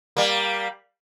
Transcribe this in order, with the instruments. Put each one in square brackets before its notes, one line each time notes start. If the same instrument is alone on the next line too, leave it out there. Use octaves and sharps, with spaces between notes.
[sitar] G3 A#3